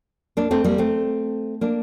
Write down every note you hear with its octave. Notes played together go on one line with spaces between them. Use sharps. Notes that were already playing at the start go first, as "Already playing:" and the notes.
A#3 D4
A3 C4
G3 A#3
A3 C4
A#3 D4